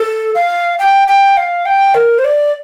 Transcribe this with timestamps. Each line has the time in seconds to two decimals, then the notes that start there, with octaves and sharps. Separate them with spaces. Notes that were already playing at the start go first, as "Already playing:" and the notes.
Already playing: A4
0.35 F5
0.79 G5
1.08 G5
1.37 F5
1.66 G5
1.95 A#4
2.18 C5
2.24 D5